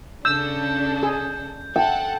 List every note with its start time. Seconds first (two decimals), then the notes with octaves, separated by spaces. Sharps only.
0.25 C#3 D4 A4 E6 G6
1.03 G#4
1.76 A4 F#5 G5